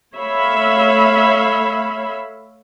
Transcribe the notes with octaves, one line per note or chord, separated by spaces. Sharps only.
A3 C#5 E5 F5 B5